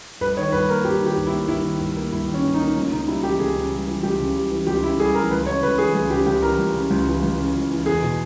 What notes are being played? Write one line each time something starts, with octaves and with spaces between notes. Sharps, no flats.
G2 B4
D#3 C#5
G2 B4
A#3 A#4
G2 G4
D#3
G4
G2
E4
A#3
G2 E4
D#3
G2
A#3
G2 E4
D#3
C#4
G2
D#4
A#3
C#2 C#4
C#3 D#4
G3 E4
E3 G4
C#2 G#4
C#3
G3
E3
C#2 G4
C#3
G3
E3
C#2 G4
C#3 E4
G3 G#4
E3 A#4
C#2 B4
C#3 C#5
C#2 B4
E3 G#4
C#2 G#4
C#3 G4
C#2 G4
E3 A#4
C#2
C#3
C#2
E3
C#2
C#3
C#2
E3
E2 G#4
B2